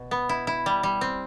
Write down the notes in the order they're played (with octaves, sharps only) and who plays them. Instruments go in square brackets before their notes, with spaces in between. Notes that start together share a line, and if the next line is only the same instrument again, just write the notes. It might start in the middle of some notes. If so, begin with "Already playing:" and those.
Already playing: [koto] B2
B3
E4
E4
G3
G3
C4